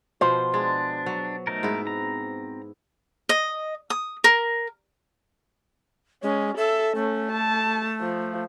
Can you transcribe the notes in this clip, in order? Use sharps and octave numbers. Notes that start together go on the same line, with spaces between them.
B2 F3 C5
G#3 D4
F#3
A3 D#4 A#4
G#2 B3 E4
C4 A#5
D#5
D#6
A#4
G#3 C#4
A4 E5
A3 C#4
A5
F3